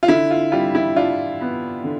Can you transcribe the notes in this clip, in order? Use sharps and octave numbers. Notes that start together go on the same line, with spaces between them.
F4
D3 E4
F4
G3 F4
E4
D4 F4
B3
D3